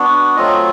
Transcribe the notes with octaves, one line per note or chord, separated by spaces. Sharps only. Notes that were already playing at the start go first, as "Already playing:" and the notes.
Already playing: B3 D4 F#4
F#3 A3 C4 F4 D#5